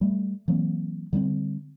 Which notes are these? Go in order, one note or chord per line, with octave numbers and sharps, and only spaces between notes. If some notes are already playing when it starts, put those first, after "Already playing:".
G3 A3
E3 F#3 A#3 C4
D3 G3 A#3 C4